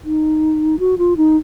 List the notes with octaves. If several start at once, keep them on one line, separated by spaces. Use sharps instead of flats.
D#4
F#4
F4
D#4